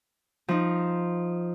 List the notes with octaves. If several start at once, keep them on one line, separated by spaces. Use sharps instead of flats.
F3 D#4